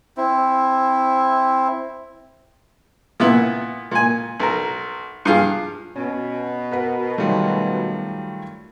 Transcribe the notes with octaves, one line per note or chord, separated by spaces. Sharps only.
C4 E4
A#2 B3 E4
A#2 G#5
B1 A#4
G2 F4 G#4
B2 C#4
A#4 B4 F#5
D#3 F#3 G3 A3 F4